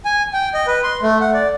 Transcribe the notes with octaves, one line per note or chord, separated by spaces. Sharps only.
G#5
G5
D#5
B4
C6
A3
F#5
D5